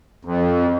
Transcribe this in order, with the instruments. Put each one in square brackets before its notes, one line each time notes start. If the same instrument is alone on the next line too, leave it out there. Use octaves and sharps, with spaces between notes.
[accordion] F2